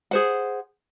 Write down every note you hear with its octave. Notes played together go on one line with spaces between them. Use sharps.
G#4 C5 F#5